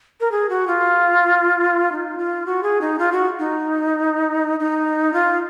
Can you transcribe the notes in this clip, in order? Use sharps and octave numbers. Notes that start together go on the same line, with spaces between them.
A#4
G#4
F#4
F4
D#4
F4
F#4
G#4
D#4
F4
F#4
D#4
D#4
F4